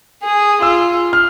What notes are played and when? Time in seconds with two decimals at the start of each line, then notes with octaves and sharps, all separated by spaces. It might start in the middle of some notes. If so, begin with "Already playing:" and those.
0.23 G#4
0.62 F4 E6
1.13 F6